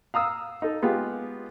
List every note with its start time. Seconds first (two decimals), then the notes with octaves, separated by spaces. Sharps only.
0.14 F5 A#5 D#6 E6
0.62 D#4 A4
0.82 G#3 B3 F4 G4